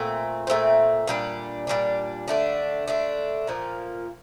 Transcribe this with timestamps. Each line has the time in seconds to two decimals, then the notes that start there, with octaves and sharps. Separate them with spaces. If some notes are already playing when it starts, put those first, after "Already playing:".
Already playing: A#2 A3 C4
0.47 A#2 A3 C4
1.07 A#2 G3 D4
1.67 A#2 G3 D4
2.28 D3 A3 D4
2.88 D3 A3 D4
3.47 A#2 F3 A#3